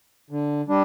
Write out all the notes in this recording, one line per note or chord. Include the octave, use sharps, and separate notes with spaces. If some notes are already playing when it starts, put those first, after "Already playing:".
D3
G3 D4